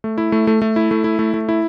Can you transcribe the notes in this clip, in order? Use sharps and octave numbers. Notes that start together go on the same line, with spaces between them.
A3
E4
A3
A3
A3
E4
A3
E4
A3
A3
E4